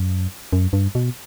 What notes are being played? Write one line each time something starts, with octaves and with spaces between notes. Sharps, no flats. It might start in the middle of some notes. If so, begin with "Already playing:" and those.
Already playing: F#2
F#2
G2
B2